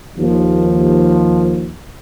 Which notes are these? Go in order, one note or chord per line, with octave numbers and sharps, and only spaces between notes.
D#2 F3